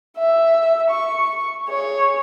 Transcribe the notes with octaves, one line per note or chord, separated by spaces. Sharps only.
E5
C#6
G#4 C#5